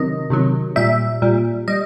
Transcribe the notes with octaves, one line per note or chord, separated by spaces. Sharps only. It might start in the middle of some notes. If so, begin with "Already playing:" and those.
Already playing: C3 D#3 F#3 D#5
C3 D#3 F#3
A#2 G3 E5
A#2 G3
G3 D#5